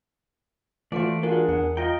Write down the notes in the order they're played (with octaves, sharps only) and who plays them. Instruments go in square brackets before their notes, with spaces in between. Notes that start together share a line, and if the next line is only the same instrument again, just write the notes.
[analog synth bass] E3 [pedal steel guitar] A3 D5 [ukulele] F4 F#4 C5
[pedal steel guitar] D4 G#4 [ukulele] F4 F#4 [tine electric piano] A#4
[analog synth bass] E2 [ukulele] F#5
[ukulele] F4 [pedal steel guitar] D#5 G5 [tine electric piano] A#5